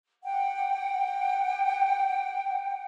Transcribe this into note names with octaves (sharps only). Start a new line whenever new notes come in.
F#5 G5